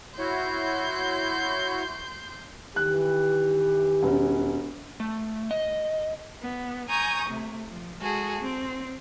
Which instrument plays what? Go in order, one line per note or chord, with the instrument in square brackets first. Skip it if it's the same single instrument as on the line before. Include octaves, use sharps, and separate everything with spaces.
[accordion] E4 F#4 C#5 [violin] C6 G6
[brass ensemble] D#3 E3 G4 [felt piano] F#6
[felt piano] E1 C#4
[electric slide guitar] A3
D#5
[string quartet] B3
G#5 A#5 C#6 D#6 G6
C3 A3
F3
G#3 F#4 G#4 A4
C4